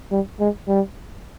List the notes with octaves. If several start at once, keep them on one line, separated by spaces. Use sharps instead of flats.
G3
G#3
G3